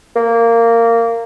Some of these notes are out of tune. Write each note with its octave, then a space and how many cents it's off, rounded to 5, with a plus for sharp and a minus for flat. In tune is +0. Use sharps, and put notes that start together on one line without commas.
A#3 -15